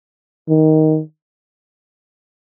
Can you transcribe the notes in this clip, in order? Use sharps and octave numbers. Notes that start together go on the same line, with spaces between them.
D#3